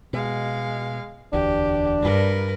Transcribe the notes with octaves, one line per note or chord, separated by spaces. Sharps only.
B2 G#3 F5
E1 D2 E3 D4 G4
G2 A#4 B4